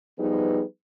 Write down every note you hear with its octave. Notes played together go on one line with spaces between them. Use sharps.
F3 G3 B3 D#4 G#4 B4